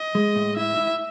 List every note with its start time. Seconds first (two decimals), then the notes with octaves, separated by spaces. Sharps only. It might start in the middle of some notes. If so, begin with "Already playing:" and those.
Already playing: D#5
0.15 G#3
0.36 A2
0.57 E4 E5
0.77 E4